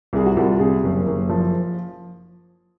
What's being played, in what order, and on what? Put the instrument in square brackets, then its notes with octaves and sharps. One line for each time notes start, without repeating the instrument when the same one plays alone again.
[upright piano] C2 G#4
F#4
C2 F4
C3 G#4
F#1
F#1
F3